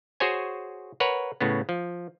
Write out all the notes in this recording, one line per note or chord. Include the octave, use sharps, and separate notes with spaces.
F#4 G#4 C5 C#5 G#5
A#4 B4 C#5 F#5
A2 C#3 B3
F3